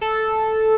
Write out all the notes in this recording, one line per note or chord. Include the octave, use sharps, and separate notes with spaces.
A4